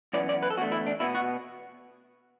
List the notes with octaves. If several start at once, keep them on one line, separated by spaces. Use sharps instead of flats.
F#2 E3 B3 D5
D5
B4
A4
E2 D3 A3 F#4
E4
D4
B2 B3 E4
F#4